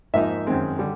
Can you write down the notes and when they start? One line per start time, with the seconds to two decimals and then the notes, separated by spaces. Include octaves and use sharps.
0.13 G#2 F3 A#3 D#4 E5
0.47 F#2 D#3 G#3 C4
0.79 D3 G3